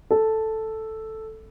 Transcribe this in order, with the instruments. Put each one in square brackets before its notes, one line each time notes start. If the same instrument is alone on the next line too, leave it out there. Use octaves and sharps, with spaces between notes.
[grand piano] A4